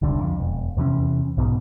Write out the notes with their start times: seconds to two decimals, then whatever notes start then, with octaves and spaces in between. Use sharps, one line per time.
0.02 E1 C2 D3
0.21 F2
0.40 E1
0.77 E2 C3 E3 C#4
1.37 B1 G#2 B2